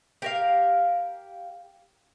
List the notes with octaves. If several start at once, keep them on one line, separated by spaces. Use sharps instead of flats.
G4 A#4 F5